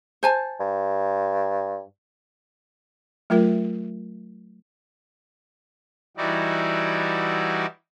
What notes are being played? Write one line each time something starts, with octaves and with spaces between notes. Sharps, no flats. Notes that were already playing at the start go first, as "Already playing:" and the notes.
C5 G#5 A5
G2
F#3 A3 F4 A#4 E5
E3 G3 D#4 E4 F#4 D5